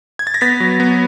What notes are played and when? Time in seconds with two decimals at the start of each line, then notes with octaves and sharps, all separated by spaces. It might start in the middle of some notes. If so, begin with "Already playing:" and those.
0.19 G#6
0.27 A6
0.34 A#6
0.41 B3 A6 B6
0.60 F#3
0.80 B3